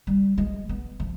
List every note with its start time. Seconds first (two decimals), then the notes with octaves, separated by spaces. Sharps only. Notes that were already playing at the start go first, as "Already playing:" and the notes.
0.07 G3
0.38 G#3
0.69 B3
1.00 F3